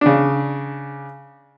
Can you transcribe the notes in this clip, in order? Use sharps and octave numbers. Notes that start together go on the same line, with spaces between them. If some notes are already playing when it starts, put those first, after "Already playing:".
C#3 D4